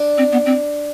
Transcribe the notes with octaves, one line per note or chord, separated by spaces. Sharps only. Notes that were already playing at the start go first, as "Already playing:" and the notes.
Already playing: D4
C4
B3
C4